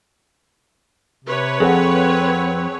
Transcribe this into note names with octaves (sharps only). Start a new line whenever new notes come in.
C3 B4 C#5
F2 C4 G#4 A4 F#5